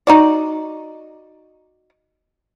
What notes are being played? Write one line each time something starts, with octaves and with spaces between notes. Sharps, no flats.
D#4 F#4 D5